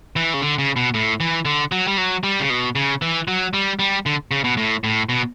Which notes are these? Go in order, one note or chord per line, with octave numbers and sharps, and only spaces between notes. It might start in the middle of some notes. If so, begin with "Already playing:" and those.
E3
C#3
D3
C#3
B2
A2
E3
D3
F#3
G3
F#3
G3
C#3
B2
C#3
E3
F#3
G3
G3
D3
C#3
B2
A2
A2
B2